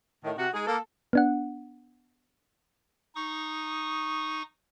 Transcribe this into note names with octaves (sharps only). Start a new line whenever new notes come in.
A2 D#3
C3 F#4
G#3 D#4 G#4
A#3 A4
B3 D4 F#5
D#4 C#6 D#6